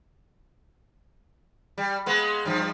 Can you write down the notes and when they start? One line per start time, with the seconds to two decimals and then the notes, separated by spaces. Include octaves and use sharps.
1.78 G3
2.06 G#3 A#3 B3
2.45 G2 F3